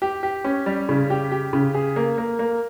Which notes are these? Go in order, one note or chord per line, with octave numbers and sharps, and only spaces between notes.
G4
G4
C#4
G3
C#3
G4
G4
C#3
G#4
A#3
A#3
A#3